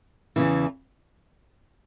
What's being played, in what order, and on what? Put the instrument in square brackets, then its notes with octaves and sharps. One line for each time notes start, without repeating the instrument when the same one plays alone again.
[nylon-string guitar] E2 C#3 E3